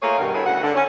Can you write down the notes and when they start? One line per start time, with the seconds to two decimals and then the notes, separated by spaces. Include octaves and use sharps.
0.02 A3 A#3 F4 G#4 C#5 F5
0.18 G2 B2 D#3
0.34 G2 E4 F#4 G#4 A4 C#5
0.46 D2 C#3 F#4 F#5
0.63 D3
0.75 C#4